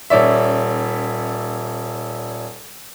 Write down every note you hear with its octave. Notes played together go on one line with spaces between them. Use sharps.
D#1 C#4 D5 E5